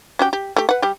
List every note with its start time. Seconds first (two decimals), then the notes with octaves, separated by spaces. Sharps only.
0.19 C#4 F#4 G4
0.33 G4
0.56 A3 G4
0.69 B4 F#5
0.82 G3 G4